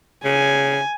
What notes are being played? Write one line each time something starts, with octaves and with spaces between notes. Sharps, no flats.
C#3 G#5